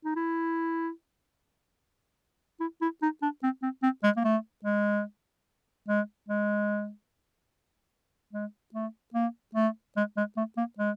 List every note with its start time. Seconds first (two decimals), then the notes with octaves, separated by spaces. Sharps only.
0.05 D#4
0.16 E4
2.60 E4
2.82 E4
3.02 D#4
3.22 D4
3.43 C4
3.62 C4
3.83 C4
4.03 G#3
4.17 A#3
4.24 A3
4.64 G#3
5.88 G#3
6.28 G#3
8.33 G#3
8.74 A3
9.14 A#3
9.55 A3
9.97 G#3
10.17 G#3
10.37 A3
10.57 A#3
10.78 G#3